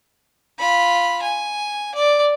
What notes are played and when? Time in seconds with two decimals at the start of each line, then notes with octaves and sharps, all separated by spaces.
0.60 F4 B5
1.22 G#5
1.95 D5